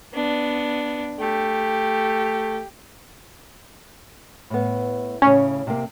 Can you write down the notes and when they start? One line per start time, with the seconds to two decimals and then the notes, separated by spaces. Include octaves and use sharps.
0.14 B3 D4
1.20 A3 G4
4.50 A2 B3
5.22 A2 C#3 C#4
5.67 C3 A#3